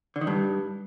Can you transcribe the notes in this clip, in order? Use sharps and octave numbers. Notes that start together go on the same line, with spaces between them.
D3
D#3
G2